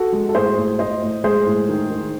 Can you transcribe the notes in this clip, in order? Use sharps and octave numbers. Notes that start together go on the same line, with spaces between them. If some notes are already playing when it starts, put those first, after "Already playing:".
Already playing: F#4 A4
G#3
A4
A2 G#4 C5
A2
A2 C5 D#5
A2
G#3 G#4 C5
A2
D#3
D#3